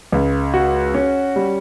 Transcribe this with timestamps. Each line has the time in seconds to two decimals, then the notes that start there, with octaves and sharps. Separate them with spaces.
0.12 C#2
0.54 F#4
0.95 C#4
1.36 G3